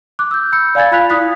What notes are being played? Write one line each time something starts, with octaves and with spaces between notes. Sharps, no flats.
D6 F#6
E6 G6
B5 E6 G6 C#7
D5 F5 G#5 B5 G#6 A6
F4 F5 B5 F#6 B6 F7
E4 D#6 F#6 B6